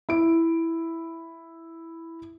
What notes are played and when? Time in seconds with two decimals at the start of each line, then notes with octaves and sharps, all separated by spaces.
0.09 E4 D7